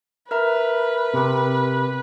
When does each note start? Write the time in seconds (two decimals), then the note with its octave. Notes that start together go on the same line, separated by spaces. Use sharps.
0.31 A#4 B4 E5 A#5
1.14 C3